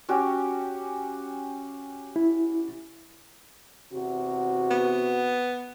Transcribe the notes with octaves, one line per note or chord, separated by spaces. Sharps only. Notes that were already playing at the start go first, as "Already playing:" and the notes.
C#4 F#4 G4
E4
E2 C3 F#4
B3